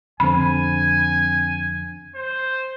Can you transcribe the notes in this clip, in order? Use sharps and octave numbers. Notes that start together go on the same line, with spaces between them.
F2 D3 C4 G#5 B5
C5